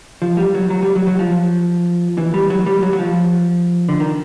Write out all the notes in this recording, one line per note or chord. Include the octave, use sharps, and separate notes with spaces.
F3
G3
F#3
F#3
G3
F#3
F#3
F3
E3
G3
F#3
G3
F#3
F#3
F3
D3
D#3